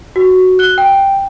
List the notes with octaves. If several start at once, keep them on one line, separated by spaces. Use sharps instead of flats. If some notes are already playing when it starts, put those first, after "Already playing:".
F#4
F#6 G7
G5